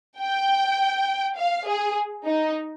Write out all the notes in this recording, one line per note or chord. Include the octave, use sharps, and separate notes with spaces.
G5
F5
G#4
D#4